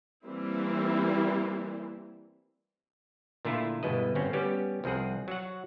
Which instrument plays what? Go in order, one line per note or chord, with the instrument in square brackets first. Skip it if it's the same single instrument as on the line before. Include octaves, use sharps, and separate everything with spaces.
[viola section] E3 G3 A#3 C4 E4
[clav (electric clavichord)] A#2 D3 A3 E4 F4
G1 B2 G#3 E4 B4 D#5
G1 A2 C4 C#4
G3 B3 C#4 G4
C2 F3 C4 G#4 F#5
F#3 F#4 F#5